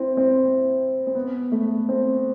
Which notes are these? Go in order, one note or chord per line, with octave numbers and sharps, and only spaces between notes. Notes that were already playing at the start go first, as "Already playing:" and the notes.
Already playing: C4 E4
C4
C4
B3
A3
C4